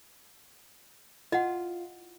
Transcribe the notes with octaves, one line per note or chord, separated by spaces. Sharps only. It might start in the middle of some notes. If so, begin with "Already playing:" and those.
F4 D#5 F#5